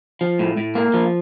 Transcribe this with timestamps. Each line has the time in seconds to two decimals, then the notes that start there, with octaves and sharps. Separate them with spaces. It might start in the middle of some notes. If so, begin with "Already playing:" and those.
0.21 F3
0.39 A2
0.57 A2
0.75 A#3
0.94 F3